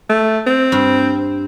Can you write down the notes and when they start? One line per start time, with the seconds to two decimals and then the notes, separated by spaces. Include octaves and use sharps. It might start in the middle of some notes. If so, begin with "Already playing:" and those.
0.09 A3
0.47 C4
0.72 G2